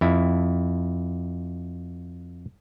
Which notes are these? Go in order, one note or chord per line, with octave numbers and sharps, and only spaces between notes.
F2 E4